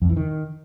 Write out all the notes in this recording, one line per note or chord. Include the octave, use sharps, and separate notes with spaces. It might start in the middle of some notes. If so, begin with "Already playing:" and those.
F2
E3
D#3